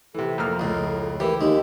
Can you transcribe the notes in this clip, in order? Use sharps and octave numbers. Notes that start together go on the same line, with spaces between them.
C3 E3 A4
F2 A#3 F6
C#2 A2
E3 E4 G4 A#4
D#2 G#3 D#4